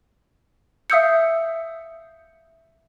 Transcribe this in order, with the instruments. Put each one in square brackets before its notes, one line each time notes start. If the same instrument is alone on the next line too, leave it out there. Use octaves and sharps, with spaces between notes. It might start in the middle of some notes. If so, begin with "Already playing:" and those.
[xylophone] E5 F5 D#6 E6 G6 C#7